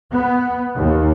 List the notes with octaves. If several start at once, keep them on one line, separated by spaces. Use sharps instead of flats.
B3
D#2